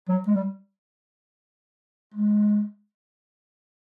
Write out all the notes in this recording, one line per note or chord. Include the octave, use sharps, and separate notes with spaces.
F#3
G#3
G3
G#3